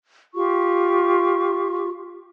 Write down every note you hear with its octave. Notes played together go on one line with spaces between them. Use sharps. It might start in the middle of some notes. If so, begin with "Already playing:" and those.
F4 G4 C#6